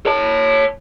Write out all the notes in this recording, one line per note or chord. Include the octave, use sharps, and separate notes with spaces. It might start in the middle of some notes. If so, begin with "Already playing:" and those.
C#5 A5